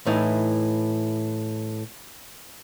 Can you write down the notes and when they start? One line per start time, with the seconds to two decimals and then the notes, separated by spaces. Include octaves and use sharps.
0.06 A2 E3 D#4